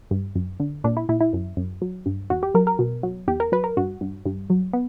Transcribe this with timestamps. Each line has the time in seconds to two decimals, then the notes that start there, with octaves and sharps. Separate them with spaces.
0.11 G2
0.36 F#2
0.60 D3
0.84 A#2 D4
0.97 E4
1.09 A#2 E4
1.21 E4
1.33 F#2
1.57 F#2
1.82 F#3
2.06 G2
2.30 E2 F#4
2.43 G4
2.54 F#3 A#4
2.67 A#4
2.79 B2
3.03 F#3
3.28 E2 G4
3.40 A#4
3.52 F#3 B4
3.64 A#4
3.77 G2 F#4
4.01 G2
4.26 G2
4.50 F#3
4.73 B3